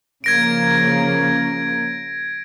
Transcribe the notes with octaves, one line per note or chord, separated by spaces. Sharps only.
C#3 F3 A#3 G#6 A#6 D7